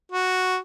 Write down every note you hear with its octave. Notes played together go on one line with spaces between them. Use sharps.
F#4